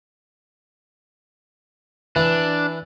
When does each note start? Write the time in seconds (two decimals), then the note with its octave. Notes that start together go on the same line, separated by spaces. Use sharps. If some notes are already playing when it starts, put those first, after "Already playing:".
2.16 E3 D4